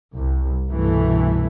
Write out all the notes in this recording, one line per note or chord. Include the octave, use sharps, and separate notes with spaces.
C2
C2 G2 B2 E3 A3